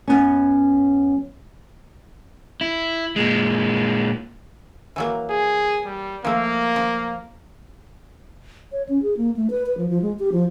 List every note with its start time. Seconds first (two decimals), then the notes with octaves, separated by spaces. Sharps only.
0.08 F#2 B3 C#4
2.61 E4
3.16 A#2 G#3
4.96 E3 F#3 A#3
5.30 G#4
5.86 G3
6.25 F3 A3 A#3
6.76 F3
8.72 C#5
8.89 C#4
9.02 G#4
9.17 A#3
9.36 A3
9.50 B4
9.66 B4
9.77 F3
9.89 F3
10.02 G#3
10.19 G4
10.32 F3